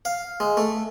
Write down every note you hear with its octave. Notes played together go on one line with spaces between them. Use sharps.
F5
G#3
A3